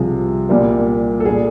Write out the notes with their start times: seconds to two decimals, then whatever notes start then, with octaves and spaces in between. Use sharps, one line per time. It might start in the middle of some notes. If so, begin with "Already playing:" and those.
Already playing: C2 C3 F3 G#4
0.49 C2 A#2 G3 A#3
1.20 A4
1.25 A#2 G3 G#4